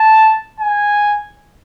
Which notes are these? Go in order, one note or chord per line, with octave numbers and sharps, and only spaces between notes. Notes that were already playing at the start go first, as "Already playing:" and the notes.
Already playing: A5
G#5